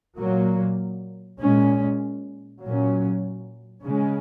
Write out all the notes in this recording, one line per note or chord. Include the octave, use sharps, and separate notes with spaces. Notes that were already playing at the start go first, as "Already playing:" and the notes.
A#2 F#3 A#3
A#2 G#3 C#4
A#2 F#3 C#4
C#3 G#3 C#4